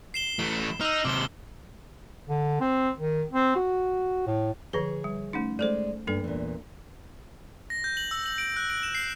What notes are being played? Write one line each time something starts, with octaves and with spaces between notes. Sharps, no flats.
C7 E7 G7
E3 A3
D#4 E6 F6
D#2 C3 D6 G7
D3
C4
D#3
C4
F#4
A2
D3 F3 G#4 B4 C#5
G3
A3 C#4 D#4
G#3 A3 A4 C5 D5
G2 A#3 D4 A4
E2 A#2
A#6
G6
F#7
E6
F#7
D7
F#6
D7
E7
C7